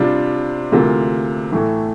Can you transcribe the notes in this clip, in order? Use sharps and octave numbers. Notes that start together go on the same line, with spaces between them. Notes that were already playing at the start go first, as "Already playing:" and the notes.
Already playing: C3 G3 D4 F4
D2 C3 E3 A#3 F4
A2 E3 A3